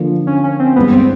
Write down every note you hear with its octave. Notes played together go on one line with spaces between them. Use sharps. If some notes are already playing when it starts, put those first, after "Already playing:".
Already playing: D3 F3 A#3
C#4
C#4
C4
G2 E3 G#3 B3
C4